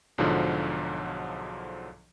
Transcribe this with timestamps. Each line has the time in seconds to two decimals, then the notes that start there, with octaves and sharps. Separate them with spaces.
0.18 B1 G#2 D3 F3 F#3